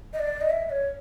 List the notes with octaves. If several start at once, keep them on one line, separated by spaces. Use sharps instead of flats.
D#5
D5
D#5
E5
C#5